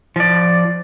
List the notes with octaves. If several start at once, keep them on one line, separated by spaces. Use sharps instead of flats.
F3 D5